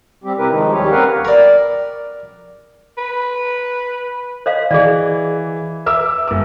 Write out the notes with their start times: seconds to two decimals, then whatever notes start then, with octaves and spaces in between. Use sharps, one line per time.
0.24 G3 C4 G4
0.38 C3 C4 E4 G4 A#4 B4
0.50 D#3 F3 G#3 D#4
0.72 D#2 G3 C#4 G4 C#5
0.91 C4 A#4 B4 F5 F#5
1.25 A#4 D5
2.98 B4
4.46 C5 D#5 F5
4.71 E3 G#4 D5
5.86 B4 E5 D6 E6
6.27 G1 D6